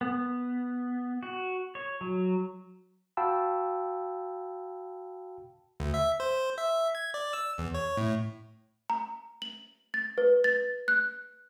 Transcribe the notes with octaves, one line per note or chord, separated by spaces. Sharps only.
B3
F#4
C#5
F#3
F#4 F5 G5 A5 B5 E6
D2
E5
C5
E5
G#6
D5
E6
E2
C#5
A2
A#5
F#7
A6
B4
A6
F#6